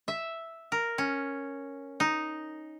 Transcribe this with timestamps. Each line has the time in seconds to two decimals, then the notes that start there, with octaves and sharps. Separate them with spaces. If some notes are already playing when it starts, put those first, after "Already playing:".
0.08 E5
0.72 A#4
0.98 C#4
2.00 D#4